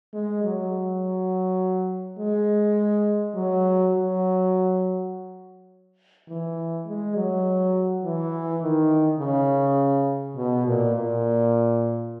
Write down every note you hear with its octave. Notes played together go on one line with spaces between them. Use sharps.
G#3
F#3
G#3
F#3
F#3
E3
G#3
F#3
E3
D#3
C#3
B2
A#2
A#2